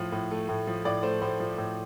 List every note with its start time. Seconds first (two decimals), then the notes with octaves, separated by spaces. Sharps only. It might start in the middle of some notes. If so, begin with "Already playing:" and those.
Already playing: A2 F3
0.12 A2
0.31 A3
0.49 A2
0.67 F3
0.85 A2 D5
1.03 A3 C5
1.22 A2 C5
1.40 F3
1.58 A2